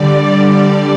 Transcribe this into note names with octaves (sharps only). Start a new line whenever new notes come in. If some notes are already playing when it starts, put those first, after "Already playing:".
Already playing: D3 G3 D5